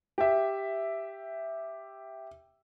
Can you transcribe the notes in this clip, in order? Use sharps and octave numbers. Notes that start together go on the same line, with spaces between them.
G4 E5